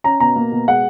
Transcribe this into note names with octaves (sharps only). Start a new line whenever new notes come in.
C#4 A#5
B2 A#5
A#3
B2
G#3 F#5